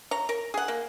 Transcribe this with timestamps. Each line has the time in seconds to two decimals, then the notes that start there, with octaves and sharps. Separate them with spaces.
0.11 C#5 A#5
0.29 A#4
0.54 G#4 F#5
0.68 A#3